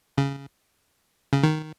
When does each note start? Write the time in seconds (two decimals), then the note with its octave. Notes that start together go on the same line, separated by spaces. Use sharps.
0.18 C#3
1.33 C#3
1.43 D#3